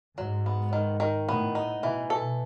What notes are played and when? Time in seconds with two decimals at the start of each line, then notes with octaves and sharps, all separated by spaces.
0.18 G#2 F#3
0.46 B3
0.73 D#3
1.00 D#3
1.28 A2 B3
1.55 D#4
1.83 B2 E3
2.10 A4